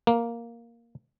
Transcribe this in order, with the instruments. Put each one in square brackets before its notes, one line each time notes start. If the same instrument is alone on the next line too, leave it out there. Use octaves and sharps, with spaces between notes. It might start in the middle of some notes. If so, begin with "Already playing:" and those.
[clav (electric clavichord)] A#3